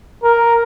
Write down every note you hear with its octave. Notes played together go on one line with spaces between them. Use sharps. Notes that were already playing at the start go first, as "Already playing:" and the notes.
A#4